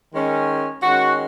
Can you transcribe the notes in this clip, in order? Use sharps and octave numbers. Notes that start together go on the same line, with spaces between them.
D#3 G#3 C#4
D#3 G#3 C#4 F#4